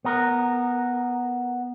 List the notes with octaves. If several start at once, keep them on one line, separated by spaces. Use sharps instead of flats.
B3 A#4